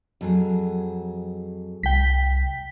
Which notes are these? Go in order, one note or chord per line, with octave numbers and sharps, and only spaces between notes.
F2 F#3 G#4
C2 G5 B6